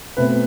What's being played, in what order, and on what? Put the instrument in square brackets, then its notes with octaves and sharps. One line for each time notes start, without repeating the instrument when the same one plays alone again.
[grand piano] B2 A3 C4 B4